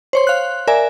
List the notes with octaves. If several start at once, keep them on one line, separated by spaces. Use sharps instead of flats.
C5 C#5 C6
F5 F#6
A#4 D5 E5 G#5